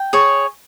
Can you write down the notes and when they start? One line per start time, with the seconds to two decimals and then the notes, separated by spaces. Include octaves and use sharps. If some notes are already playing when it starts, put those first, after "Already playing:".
Already playing: G5
0.13 G#4 C#5